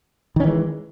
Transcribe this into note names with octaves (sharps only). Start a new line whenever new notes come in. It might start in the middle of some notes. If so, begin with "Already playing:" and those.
D#3 E3 G#3 C#4